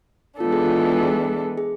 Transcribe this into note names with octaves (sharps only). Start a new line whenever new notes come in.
E3 G#3 B3 D4 F4 A4
G#4
F4
G#4
G#4